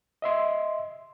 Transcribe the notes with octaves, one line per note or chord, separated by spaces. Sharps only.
D#5 E5 C6